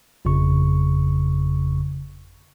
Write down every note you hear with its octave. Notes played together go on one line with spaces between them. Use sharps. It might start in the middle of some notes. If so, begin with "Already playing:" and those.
G1 F2 C#3 C#6